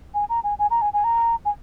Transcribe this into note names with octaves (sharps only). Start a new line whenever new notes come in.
G#5
A#5
G#5
G#5
A#5
G#5
G#5
A#5
G#5